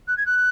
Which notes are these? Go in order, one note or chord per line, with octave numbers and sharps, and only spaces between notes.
F#6
G#6
F#6